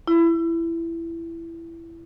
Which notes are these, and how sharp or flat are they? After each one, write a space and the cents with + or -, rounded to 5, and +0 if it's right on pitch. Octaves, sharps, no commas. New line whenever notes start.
E4 +15